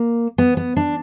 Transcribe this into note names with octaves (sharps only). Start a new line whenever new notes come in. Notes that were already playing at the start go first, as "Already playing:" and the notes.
Already playing: A#3
B3
B3
D4